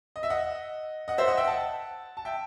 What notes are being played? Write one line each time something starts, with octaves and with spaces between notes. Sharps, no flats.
D#5
E5
D#5 F#5
D#5 F#5
C5 E5
D#5 F#5
E5 G5
F#5 A5
A5
E5 G5